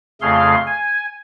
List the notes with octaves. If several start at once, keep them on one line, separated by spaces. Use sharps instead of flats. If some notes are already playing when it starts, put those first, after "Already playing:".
F2 C#3 A3 G#4 F5 C6
G#5